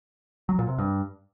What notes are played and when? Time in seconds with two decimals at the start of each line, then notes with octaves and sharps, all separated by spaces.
0.49 F#3
0.59 A#2
0.69 C3
0.78 G2